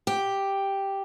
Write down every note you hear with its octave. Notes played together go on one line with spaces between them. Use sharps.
G4